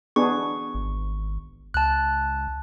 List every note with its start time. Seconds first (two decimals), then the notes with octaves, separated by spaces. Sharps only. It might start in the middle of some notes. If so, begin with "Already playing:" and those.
0.16 B3 D4 G#4 C#6
0.74 G#1
1.74 C#2 A5 F#6